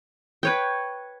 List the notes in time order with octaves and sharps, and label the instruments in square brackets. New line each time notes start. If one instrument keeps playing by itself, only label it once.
[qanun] B4 C#5 G5